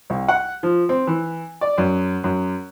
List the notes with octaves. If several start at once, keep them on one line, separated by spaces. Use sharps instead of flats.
C2
F#5
F3
C4
E3
D5
F#2
F#2